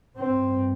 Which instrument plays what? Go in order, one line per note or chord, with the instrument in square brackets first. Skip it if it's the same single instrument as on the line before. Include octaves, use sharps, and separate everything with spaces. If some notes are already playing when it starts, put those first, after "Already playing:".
[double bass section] G2 C4